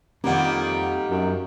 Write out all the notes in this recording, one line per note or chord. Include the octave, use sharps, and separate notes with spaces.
F2 D#3 G3 A#3 C4 G4 F#5
F#2